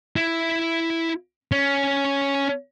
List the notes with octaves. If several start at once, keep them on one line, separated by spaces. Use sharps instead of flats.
E4
C#4